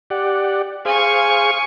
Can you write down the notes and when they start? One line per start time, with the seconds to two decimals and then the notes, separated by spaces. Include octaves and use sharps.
0.10 G4 D5 F#5
0.85 G#4 C5 F5 G#5 C#6